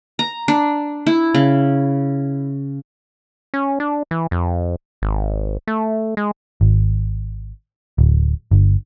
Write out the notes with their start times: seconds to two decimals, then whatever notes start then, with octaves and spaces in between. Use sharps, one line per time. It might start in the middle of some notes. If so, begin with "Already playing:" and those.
0.19 A#5
0.48 D4
1.06 E4
1.34 C#3
3.54 C#4
3.80 D4
4.11 E3
4.31 F2
5.02 G#1
5.67 A3
6.17 G#3
6.61 G#1
7.98 D1
8.51 G1